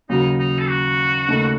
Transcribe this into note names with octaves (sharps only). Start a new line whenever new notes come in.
D#2 C#3 F#3 D#4
D#4
A4
F#4
D#2 C#3 A3 D#4 A4